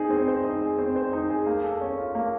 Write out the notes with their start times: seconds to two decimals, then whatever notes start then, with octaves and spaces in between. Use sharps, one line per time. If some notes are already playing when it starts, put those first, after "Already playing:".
Already playing: C4 D#4 G#4
0.10 C4
0.28 C5
0.45 D#4
0.61 G#4
0.78 C4
0.96 C5
1.13 D#4
1.30 G#4
1.46 A#3
1.64 A4
1.81 C#4
1.98 F4
2.15 A#3